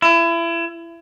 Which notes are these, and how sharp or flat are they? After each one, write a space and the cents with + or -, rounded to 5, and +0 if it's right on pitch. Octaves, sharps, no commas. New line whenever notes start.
E4 +30